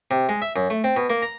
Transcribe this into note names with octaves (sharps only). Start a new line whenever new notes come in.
C3
G#3
E5
F#2
A3
C4
B2
A#3
A#5